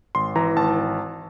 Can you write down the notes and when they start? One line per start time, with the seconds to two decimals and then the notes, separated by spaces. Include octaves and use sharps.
0.15 G#1 C6
0.36 E3 A#5
0.56 G#1 A5